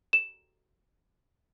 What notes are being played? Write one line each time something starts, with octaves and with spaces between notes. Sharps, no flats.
E7